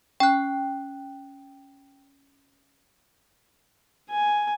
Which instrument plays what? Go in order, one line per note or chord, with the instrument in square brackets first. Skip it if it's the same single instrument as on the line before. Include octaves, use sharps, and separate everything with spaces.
[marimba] C#4 [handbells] G5 F#6
[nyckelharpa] G#5